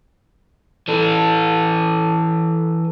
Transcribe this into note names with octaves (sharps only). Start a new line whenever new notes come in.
E3 A4